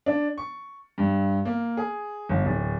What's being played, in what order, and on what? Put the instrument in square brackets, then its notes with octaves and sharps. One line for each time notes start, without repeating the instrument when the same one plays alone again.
[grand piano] D4
C#6
G2
A#3
G#4
G1
D1